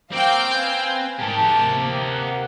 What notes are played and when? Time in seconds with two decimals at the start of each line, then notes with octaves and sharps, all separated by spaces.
0.12 A#3 C4 F#4 F5 G5 D6
0.51 B4 G#5
1.19 G#2 G4 A#4 A5
1.58 C3 A#3
2.11 F#5